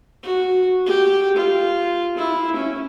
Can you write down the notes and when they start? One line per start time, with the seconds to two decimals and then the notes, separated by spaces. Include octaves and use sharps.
0.23 F#4
0.86 G4
1.37 F4
2.17 E4
2.56 C#4